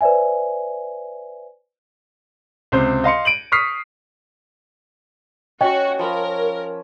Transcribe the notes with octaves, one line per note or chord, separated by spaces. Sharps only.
B4 C5 D5 E5 G#5
C#2 C3 C5
D#5 F5 C6 C#7
D7 D#7 F#7
C#6 D#6 F6 B6 C7
C#4 F#4 D#5 G5
F3 A#4 B5